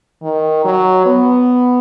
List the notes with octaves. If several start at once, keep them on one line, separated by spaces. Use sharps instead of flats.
D#3
F#3
B3